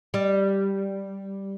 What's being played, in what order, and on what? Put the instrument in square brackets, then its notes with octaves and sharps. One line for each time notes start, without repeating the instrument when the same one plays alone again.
[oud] G3